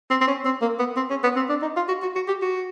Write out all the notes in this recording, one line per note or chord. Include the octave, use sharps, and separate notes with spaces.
C4
C4
C#4
C4
A#3
B3
C4
C#4
B3
C4
D4
D#4
F4
F#4
F#4
F#4
G4
F#4